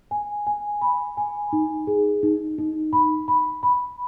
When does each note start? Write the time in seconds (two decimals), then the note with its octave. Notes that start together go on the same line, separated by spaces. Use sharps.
0.11 G#5
0.47 G#5
0.81 B5
1.17 G#5
1.53 D#4
1.87 G#4
2.23 D#4
2.58 D#4
2.93 B5
3.28 B5
3.63 B5